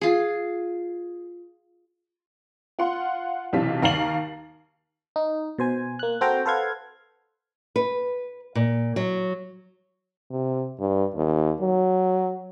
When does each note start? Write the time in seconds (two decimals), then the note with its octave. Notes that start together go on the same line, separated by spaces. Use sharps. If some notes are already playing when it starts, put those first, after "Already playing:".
0.01 F4 G#4
2.79 F4 F5 F#5 C6
3.53 B1 C3 E3 F5 A5 B6
3.82 D#2 F5 A#5 A6 C7 F#7
5.16 D#4
5.59 B2 C5 G#5
5.99 A#3 F#6
6.21 C4 F#4 A4 C5 G5 A#5
6.46 A4 B4 C5 F5 F#5 G#6
7.76 B4
8.55 A#2
8.96 F#3
10.31 C3
10.80 G2
11.15 D#2
11.61 F#3